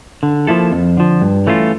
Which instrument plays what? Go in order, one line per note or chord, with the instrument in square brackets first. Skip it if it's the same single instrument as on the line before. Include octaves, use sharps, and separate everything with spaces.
[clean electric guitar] D3
F3 A#3 E4 A4
F2
D3 F3
G2
E3 A3 C#4 F4